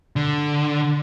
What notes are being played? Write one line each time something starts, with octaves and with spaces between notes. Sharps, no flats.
D3